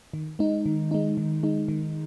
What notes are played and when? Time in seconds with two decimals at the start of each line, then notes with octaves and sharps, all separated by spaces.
0.13 D#3
0.39 G#3 D#4
0.66 D#3
0.91 G#3 D#4
1.17 D#3
1.43 G#3 D#4
1.68 D#3